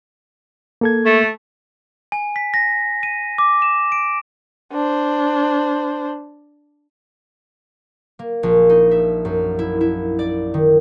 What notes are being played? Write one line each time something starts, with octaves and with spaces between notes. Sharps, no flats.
A#3 A4 G#6
A3
G#5
B6
A#6
D#7
D6
E7
D7
D4 C5
A#3
A#1
D#4
E5
F#2
E4
E4
D5
D#3